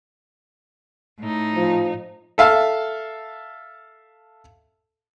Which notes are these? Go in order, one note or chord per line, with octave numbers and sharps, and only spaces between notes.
A2 D#4
F3
A4 E5 F5 A5